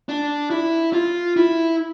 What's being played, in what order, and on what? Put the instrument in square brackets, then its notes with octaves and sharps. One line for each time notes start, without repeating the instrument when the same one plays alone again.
[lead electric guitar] D4
E4
F4
E4